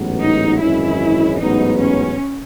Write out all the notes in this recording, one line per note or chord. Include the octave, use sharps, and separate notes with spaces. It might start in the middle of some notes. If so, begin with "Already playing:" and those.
Already playing: A1 G#2 F#3 B3
D#4
G#1 F#2 E3 G#3 C#4 E4
A1 G#2 F#3 B3 D#4
C#4